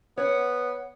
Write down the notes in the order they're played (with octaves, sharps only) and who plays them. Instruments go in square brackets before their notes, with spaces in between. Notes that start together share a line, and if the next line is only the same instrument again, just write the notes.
[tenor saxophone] B3 [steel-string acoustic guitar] C#5 F#5